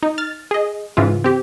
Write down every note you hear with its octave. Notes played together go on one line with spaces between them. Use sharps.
D#4
F6 A6
G#4 D#5
G#2 C#3 E3 F4
C4 G4